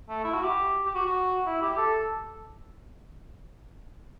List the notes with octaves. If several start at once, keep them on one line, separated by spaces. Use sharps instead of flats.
A3
E4
F#4
G4
G4
F#4
F#4
E4
G4
A4